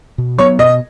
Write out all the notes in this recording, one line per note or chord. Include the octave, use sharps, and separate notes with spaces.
B2
F#3 B3 C#5
B2 D#5